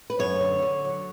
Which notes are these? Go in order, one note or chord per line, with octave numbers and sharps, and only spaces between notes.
B4
F#2 C#5
D3
D3
F#3